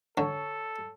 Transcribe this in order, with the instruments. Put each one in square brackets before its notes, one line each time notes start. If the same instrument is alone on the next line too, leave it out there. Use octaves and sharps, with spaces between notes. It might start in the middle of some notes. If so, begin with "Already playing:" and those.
[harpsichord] D3 [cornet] A4 [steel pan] C#5